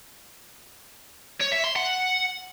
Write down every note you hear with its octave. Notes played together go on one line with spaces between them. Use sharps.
C#5
E5
C6
F#5